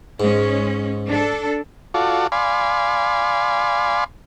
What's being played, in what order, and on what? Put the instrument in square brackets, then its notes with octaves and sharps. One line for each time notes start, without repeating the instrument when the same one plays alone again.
[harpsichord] G#2 [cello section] G#3 C#4
[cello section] D4 A4
[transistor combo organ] F4 F#4 A4 D5
D5 F5 G#5 B5 C6